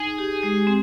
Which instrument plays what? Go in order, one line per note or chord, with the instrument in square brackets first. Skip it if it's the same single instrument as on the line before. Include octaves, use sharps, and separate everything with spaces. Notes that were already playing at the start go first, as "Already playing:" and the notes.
Already playing: [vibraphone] D#4 [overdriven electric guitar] G#4
[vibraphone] G4
G#3
C4